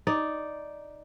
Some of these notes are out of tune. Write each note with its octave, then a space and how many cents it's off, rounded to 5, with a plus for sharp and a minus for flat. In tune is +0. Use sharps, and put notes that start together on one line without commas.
D#4 +0 D5 +0